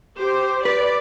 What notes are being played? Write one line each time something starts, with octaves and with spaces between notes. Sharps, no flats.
G4 C5
B4 D5